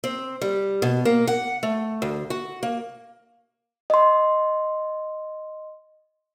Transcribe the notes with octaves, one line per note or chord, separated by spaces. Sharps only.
C4
G3
B2
A#3
F#5
A3
D2
F#4
A#3
D#5 C6